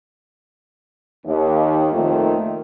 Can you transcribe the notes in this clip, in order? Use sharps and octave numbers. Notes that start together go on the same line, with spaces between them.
D#2
F2 A#2 D#3 A3